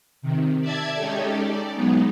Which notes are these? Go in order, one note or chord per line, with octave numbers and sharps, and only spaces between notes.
C3 D#3
D5 E5 A5 G#6
G#3 C#4 D#4 G4 A4
D5
F#3 G#3 B3 D#4